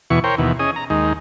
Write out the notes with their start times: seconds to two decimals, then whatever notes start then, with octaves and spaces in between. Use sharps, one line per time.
0.10 E2 B2 E3 C#6
0.24 A#4 C5 C#5 G5
0.38 D#2 B2 E3
0.59 C#4 G#4 D#5
0.76 A#5
0.90 D#2 G#3 D#4